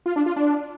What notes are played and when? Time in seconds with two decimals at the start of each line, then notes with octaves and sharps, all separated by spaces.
0.06 F4
0.16 D4
0.26 F4
0.36 D4